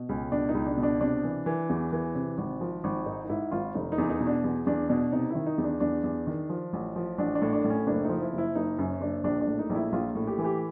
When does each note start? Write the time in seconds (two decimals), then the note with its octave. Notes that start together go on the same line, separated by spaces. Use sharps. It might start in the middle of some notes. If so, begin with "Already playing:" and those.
Already playing: B2
0.09 C#2 C#4
0.32 B2 D4
0.49 D#4
0.54 C#2
0.66 D4
0.77 B2
0.83 D4
1.01 C3 D4
1.24 E3
1.46 E3
1.69 E2
1.92 E3
2.15 C3
2.38 G#1
2.61 F3
2.84 G#1
3.06 G#2 D#4
3.24 D#4
3.29 G#2 E4
3.52 G#1 F4
3.75 F1 D#4
3.92 D#4
3.98 E2
4.09 D#4
4.20 B2
4.27 D4
4.44 E2
4.67 E2 D4
4.89 B2 D4
5.12 C3 D#4
5.30 E4
5.35 D#3
5.46 D#4
5.58 E2
5.64 D4
5.80 E2 D4
6.04 E2
6.27 D#3
6.49 F3
6.73 A1
6.96 F3
7.18 A1 D4
7.35 D4
7.42 A2
7.53 D4
7.64 A2
7.70 C#4
7.87 F#1 D4
8.04 F3 D#4
8.22 E4
8.33 F#1 E4
8.55 F#1 D#4
8.78 F#2 C#4
9.01 F#1 D4
9.24 A#1 D4
9.41 D4
9.47 A2
9.59 D#4
9.70 A#1
9.75 E4
9.92 A#1 F4
10.15 A2
10.27 G4
10.38 E3
10.44 G4